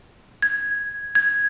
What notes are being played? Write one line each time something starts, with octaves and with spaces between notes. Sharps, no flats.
G#6
G#6